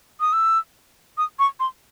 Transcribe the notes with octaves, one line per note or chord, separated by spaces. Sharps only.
D#6
E6
D#6
C#6
C6